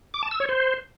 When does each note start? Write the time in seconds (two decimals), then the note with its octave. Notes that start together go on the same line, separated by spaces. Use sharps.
0.14 D6
0.23 A5
0.31 E6
0.40 C#5
0.49 C5